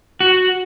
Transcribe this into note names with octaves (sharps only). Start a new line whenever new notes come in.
F#4